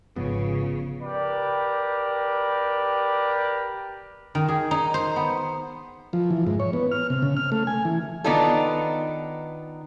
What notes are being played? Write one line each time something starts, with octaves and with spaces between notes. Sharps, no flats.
G#1 C#3 F3 B3 F4 G#4
G4 A#4 B4 D5
D#3
G#4
D#4
C5
B3
F3
E3
G#2
C#5
B3
F6
C3
C#3
F6
A3
G#5
E3
D#3 B3 D4 D#4 F4 A4